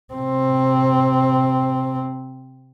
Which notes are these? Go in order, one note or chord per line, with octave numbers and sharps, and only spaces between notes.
C3 C4